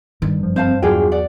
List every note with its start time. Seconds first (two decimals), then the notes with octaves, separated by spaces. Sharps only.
0.22 G2 D#3
0.39 F#1 F3
0.56 C4 C5 F5 A5
0.83 E2 F#3 D4 F4 F#4 G#4 G5
1.12 D5 F#5